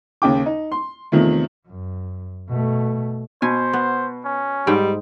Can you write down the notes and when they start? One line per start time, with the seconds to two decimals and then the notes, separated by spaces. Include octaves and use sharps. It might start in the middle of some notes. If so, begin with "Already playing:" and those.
0.22 D#2 C#3 G5 D6
0.46 D#4
0.72 C6
1.12 E2 C3 D#3 F3 A3
1.67 F#2
2.48 B2 A3
3.42 B2 C5 G#5
3.73 B3
4.25 C#4
4.67 G#2 G3 G5